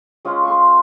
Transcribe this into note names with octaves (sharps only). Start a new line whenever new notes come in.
G#3 C#4 F4
C6 C#6